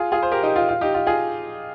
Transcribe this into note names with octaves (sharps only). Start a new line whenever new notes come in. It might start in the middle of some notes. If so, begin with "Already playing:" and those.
Already playing: F4 G#4
F4 G#4
C5
G4 A#4
D#4 G4
F4
F4
D#4 G4
F4
F4 G#4